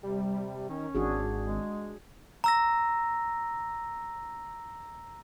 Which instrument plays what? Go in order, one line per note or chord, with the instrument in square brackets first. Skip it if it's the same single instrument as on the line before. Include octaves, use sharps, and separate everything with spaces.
[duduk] C3 [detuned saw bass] G3
[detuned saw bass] D#3 [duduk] C#4
[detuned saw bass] G#1 [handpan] D4 F#4 G#4
[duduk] G#3
[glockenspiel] A#5 E6 A#6